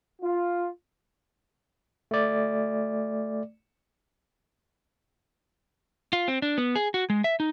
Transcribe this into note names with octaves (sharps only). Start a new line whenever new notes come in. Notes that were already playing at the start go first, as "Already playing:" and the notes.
F4
A3 D5
F4
C4
D4
B3
G#4
F#4
G#3
E5
D#4